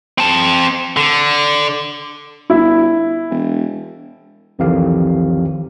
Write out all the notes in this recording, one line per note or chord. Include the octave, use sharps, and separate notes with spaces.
C4 A5
D3
G1 E4
E1
C2 F2 D#3 E3 G4 F5